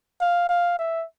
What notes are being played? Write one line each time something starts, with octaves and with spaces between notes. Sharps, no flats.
F5
F5
E5